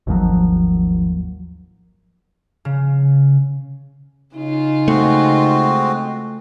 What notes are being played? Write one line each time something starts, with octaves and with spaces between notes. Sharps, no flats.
G#1 D#2 F3 F#3
C#3
C#3 D#4 F4
G#3 A3 C4 F#4